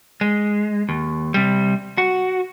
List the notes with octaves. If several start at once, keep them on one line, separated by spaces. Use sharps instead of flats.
G#3
D#2
C3 G3
F#4